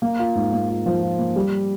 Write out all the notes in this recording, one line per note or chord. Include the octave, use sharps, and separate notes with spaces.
A#3
F4
G#2
A#3
F4
F3
F4
A#3
G3